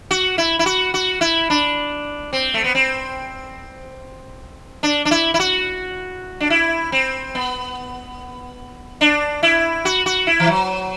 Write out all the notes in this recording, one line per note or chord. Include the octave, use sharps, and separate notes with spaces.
F#4
E4
E4
F#4
F#4
E4
D4
C4
A3
B3
C4
D4
D4
E4
E4
F#4
D4
E4
C4
B3
D4
E4
F#4
F#4
E4
E3
F#3